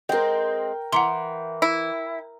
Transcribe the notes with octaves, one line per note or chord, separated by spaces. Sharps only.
G#3 C4 A#4 G5
E3 F#5 A#5 C6
E4